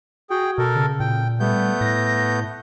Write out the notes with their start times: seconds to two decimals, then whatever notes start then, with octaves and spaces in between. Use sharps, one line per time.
0.30 F#4 G#4 G5
0.58 B2 A4 A#4
0.75 C#3
1.00 A#2 G5
1.40 G3 A3 B3 G6
1.81 A2 A#6